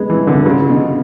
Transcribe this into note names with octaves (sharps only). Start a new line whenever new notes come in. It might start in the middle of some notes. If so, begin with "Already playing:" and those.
Already playing: G#3 B3
E3
D3
C#3
B2